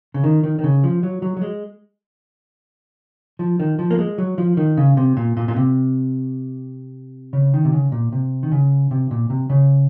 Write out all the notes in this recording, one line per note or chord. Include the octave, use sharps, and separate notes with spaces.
C#3
D#3
D#3
D#3
C#3
F3
F#3
F#3
F#3
G#3
F3
D#3
F3
A#3
G#3
F#3
F3
D#3
C#3
C3
A#2
A#2
A#2
C3
C#3
D#3
C3
C#3
A#2
C3
D#3
C#3
C3
A#2
C3
C#3